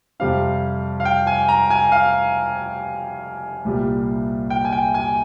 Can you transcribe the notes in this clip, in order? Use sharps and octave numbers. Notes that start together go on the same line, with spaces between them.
F2 C3 G3 C4 F5
F5
G5
G#5
A#5
G#5
F5
C2 A#2 G3
G5
G#5
G5
G#5